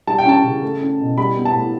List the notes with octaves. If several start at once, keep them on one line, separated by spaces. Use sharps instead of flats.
G3 A5
G5
C#4 A5
C#3
A3
C#4
B2
G3 B5
B3
A5
A2